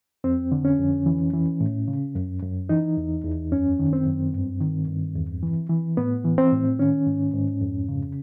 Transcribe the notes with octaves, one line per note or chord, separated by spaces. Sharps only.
F2 C4
D3
C#4
F2
E3
E3
A2
C#3
F#2
F#2
E3 D#4
E2
E2
F#2 C#4
D#3
C4
F#2
G2
D#3
G2
E2
E3
E3
A2 B3
E3
C4
A2
D#3 C#4
G#2
G#2
F2
C#3